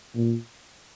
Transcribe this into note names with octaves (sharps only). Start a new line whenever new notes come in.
A#2